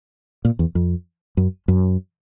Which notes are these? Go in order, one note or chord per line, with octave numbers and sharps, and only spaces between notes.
A#2
E2
F2
F#2
F#2